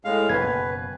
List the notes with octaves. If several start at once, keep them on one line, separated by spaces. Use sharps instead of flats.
A2 G#3 F5
F#1 B2 B4 G#6